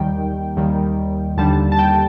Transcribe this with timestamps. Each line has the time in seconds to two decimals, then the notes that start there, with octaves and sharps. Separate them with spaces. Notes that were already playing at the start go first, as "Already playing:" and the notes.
Already playing: D#2 D#3 G3 G5
0.57 D#2 D#3 G3
1.37 D#2 D3 G3 A5
1.72 A5
1.79 G5